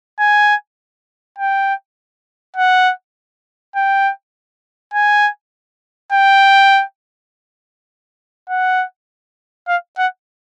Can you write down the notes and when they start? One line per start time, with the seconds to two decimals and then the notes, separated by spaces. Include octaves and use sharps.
0.19 G#5
1.38 G5
2.56 F#5
3.75 G5
4.94 G#5
6.12 G5
8.49 F#5
9.68 F5
9.98 F#5